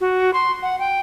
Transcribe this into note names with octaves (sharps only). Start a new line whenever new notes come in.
F#4
C6
F#5
G5